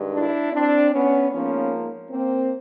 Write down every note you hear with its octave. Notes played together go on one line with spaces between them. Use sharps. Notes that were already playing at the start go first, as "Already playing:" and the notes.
Already playing: G2 D#3 G#3
D4 E4
C4 D4
B3 C#4
G#2 F3 A#3 B3 C#4
A#3 C4